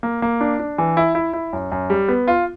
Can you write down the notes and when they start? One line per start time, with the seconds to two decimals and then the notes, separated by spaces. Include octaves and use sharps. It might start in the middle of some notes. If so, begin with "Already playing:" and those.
0.03 A#3
0.22 A#3
0.41 D4
0.59 D4
0.78 E3
0.97 E4
1.15 E4
1.33 E4
1.53 F#2
1.72 F#2
1.90 G3
2.08 B3
2.28 F4